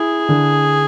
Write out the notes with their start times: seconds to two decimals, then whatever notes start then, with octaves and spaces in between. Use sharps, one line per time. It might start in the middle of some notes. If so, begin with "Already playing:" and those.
Already playing: E4 G#4
0.29 D3